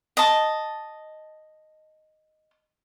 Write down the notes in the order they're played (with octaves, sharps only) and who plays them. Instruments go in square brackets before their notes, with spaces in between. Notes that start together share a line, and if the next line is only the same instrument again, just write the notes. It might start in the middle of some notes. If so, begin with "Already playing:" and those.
[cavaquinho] D#5 A5